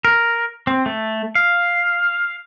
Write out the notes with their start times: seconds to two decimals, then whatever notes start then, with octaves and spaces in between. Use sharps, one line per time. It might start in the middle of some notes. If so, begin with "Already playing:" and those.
0.05 A#4
0.67 C4
0.86 A3
1.35 F5